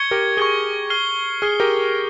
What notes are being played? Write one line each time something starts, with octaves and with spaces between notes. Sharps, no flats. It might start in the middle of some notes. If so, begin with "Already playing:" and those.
Already playing: C#6 G#6 C#7 G7
G4 A#4
G#4 C#6 G#6 C#7 G7
F6 C7 G7
G#4 F6 C7 G7
G4 A#4